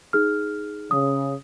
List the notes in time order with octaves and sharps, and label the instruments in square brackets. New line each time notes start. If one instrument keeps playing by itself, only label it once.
[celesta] D#4 G#4 F6
[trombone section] C#3 [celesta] D#6